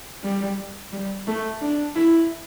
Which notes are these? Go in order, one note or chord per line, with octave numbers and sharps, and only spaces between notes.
G3
G3
A3
D4
E4